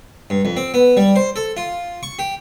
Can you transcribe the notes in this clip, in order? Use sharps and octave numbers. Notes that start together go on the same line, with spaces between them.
G2
F2
C4
B3
G3
C5
A4
F4
C#6
G4